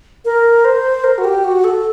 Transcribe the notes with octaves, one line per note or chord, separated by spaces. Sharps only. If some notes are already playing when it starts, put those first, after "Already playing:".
A#4
C5
A#4
F#4
G4
F#4
A4